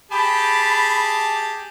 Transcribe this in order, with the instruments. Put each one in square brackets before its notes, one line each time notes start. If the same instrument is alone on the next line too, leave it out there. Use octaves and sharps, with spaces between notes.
[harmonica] G4 G#4 A5 [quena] B5